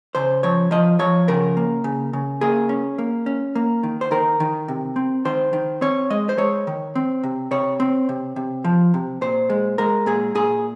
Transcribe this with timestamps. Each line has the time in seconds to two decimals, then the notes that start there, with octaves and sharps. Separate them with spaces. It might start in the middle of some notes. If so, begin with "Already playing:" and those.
0.15 C#3 C5
0.43 F3 C#5
0.71 F3 D#5
0.99 F3 C#5
1.28 C#3 A#4
1.57 A#3
1.84 C#3
2.13 C#3
2.41 A#3 G#4
2.69 C#4
2.98 A#3
3.26 C#4
3.55 A#3
3.83 D#3
4.01 C5
4.11 D#3 A#4
4.40 D#3
4.68 C3
4.96 C4
5.25 D#3 C5
5.53 D#3
5.81 C4 C#5
6.10 G#3 D#5
6.29 C5
6.37 G#3 C#5
6.67 D#3
6.95 C4
7.23 C3
7.51 C3 C#5
7.80 C4
8.09 C3
8.36 C3
8.64 F3
8.94 C3
9.21 A#2 C5
9.50 G#3
9.78 G#3 A#4
10.06 A#2 G#4
10.35 A#2 G#4